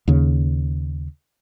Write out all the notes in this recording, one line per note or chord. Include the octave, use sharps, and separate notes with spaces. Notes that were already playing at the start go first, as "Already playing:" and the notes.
D#2 C#3